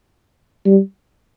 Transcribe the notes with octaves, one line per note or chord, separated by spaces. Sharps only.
G3